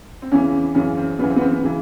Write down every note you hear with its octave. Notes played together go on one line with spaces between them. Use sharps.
C4
E2 C#3 E3 C#4
F#2 C#3 E3 C#4
C4
F#2 C#3 E3 B3
C4
B3
C4
B3
C#3 E3